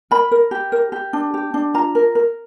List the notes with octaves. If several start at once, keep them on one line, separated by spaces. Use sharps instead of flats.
A#4 B5
A#4
G4
A#4
G4
D4
G4
D4
F4 A#5
A#4
A#4